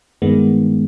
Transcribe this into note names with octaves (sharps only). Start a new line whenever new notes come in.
G2 D#3 G#3 B3